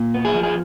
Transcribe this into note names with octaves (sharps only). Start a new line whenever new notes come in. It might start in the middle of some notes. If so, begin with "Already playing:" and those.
Already playing: A#2
B3
G#4
F3
G#4